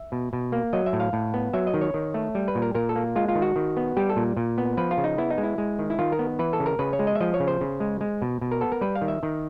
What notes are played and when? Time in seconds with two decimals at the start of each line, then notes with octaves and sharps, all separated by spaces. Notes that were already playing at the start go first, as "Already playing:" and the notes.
Already playing: E5
0.12 B2
0.33 B2
0.52 A#3
0.73 F#3 D#5
0.86 E5
0.93 A2
1.00 F5
1.13 A2
1.34 B3
1.53 F#3 E5
1.67 D#5
1.74 D#3
1.81 C#5
1.94 D#3
2.14 A3
2.35 G3
2.48 B4
2.55 A#2
2.62 A#4
2.75 A#2 A#4
2.89 A4
2.96 A#3
3.16 G#3 F4
3.28 F4
3.35 D#3
3.42 F#4
3.56 D#3
3.77 B3
3.97 G3 G4
4.10 A4
4.16 A#2
4.37 A#2
4.58 B3
4.77 F3 B4
4.91 F4
4.98 C#3
5.04 D#4
5.18 B3 E4
5.30 D#4
5.38 G#3
5.43 E4
5.58 G#3
5.79 D#3
5.90 E4
5.99 D#3 F4
6.12 A#4
6.19 B3
6.39 E3 B4
6.53 A4
6.60 C#3
6.66 A#4
6.79 C#3 B4
6.93 C#5
6.99 G#3
7.07 D#5
7.15 E5
7.20 F3 D#5
7.34 C#5
7.40 C#3
7.47 C5
7.61 C#3
7.80 G#3
8.01 G#3
8.22 B2
8.41 B2
8.52 A#4
8.61 B3 A4
8.72 A#4
8.81 G3 B4
8.95 F5
9.01 D#3
9.08 E5
9.23 D#3